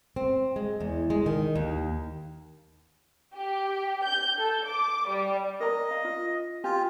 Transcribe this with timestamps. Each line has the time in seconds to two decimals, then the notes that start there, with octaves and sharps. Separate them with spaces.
0.16 C4
0.56 G#3
0.80 E2
1.10 G#3
1.26 D#3
1.56 D#2
3.34 G4
4.04 G6
4.36 A4
4.65 D6
5.08 G3
5.60 A#4 C#5 D#5 A#5
5.91 F5
6.04 F4
6.64 F4 G4 C#5 G#5